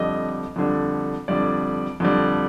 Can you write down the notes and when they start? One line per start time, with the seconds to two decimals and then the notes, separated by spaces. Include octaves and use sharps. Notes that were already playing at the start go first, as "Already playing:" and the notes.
Already playing: F2 D3 G3 D#5
0.56 F2 D3 G3
1.28 F2 D3 G3 D5
2.00 F2 D3 G3